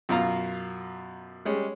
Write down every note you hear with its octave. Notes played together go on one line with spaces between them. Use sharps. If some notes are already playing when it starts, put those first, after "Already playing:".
F#2 B2 F4 F5 A#5
G3 G#3 C#4